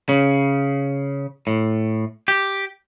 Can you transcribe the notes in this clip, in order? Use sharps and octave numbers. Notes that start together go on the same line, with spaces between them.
C#3
A2
G4